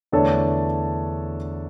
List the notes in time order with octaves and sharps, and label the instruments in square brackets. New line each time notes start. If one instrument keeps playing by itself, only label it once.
[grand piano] E2 D3 A3 D4 A4 C#5